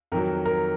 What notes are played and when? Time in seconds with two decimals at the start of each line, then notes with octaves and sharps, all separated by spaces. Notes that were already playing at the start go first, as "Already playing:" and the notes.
0.12 F2 D#3 F#3 A#4
0.46 A#4